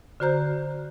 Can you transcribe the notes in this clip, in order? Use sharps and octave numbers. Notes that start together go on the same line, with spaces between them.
D3 F#4 C5 A#5 G6